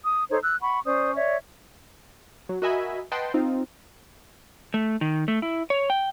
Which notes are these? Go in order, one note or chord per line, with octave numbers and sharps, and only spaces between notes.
D#6
D#4 A4 C5 C#5
E6 F#6
F#5 B5 C#6
C#4 C5 D5 D#6
C#5 D5 E5
F#3
F#4 A#4 D#5 E5 G#5 B5
B4 D#5 F#5 G5 A5 C6
C4 D#4 F4
A3
D#3
A3
E4
C#5
G5